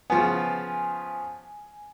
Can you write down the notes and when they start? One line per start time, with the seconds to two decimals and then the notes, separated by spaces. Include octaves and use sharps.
0.10 C#3 F3 B3 G#5